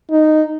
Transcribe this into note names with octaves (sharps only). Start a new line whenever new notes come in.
D#4